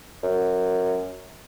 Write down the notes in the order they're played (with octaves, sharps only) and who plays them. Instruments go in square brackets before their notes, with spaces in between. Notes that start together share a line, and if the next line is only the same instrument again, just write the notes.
[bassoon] F#2